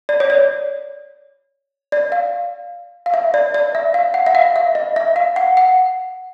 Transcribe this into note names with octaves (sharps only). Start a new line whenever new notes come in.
D5
C#5
D5
D5
F5
F5
E5
D5
D5
E5
F5
F#5
E5
F5
E5
D#5
E5
F5
F#5
F#5